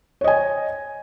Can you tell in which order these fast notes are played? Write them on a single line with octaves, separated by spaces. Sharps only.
C#5 D#5 G#5